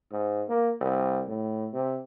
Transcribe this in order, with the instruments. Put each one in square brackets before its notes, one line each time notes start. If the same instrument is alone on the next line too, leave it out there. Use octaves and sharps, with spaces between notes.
[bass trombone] G#2
A#3
C2
A2
C3